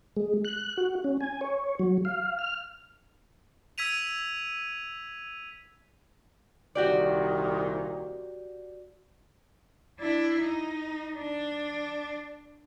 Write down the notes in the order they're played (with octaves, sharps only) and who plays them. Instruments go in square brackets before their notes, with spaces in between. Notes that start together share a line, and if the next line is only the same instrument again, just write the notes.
[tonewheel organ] G#3
F#6
F#4
C#4
G#5
C#5
F#3
F5
F6
[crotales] E6 G#6 B6 D#7 F7
[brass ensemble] C2 A#2 D#3 [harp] F#4 G4 D5
[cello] D4 E4
D#4
D4